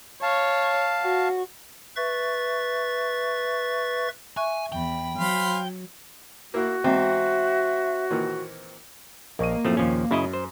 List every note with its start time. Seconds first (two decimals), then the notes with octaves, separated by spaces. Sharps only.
0.22 C#5 F5 A5
1.02 F#4
1.96 B4 E5 C#6 A6
4.37 E5 G#5 C#6 F#6
4.72 E2 G5 B5
5.18 F#3 C5 F5 B5
6.54 A#3 E4 F#4
6.84 E2 G#2 C4 E5
8.10 A#2 D#3 E3
9.39 A#1 A#3 D#5 C#6 D#7
9.65 F#2 A2 F3 A3 C4
9.77 D#2 A#2 F3 C#4
10.11 F#2 C#3 E4 D#5
10.33 C5